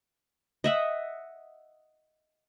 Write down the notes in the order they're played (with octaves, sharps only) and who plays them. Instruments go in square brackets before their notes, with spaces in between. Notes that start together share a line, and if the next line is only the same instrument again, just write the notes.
[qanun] D#5 E5 F#5